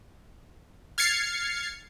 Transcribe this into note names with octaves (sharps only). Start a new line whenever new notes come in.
F6 G#6 A6 C7 C#7